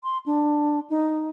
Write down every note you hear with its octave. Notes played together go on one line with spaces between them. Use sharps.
C6
D4
D#4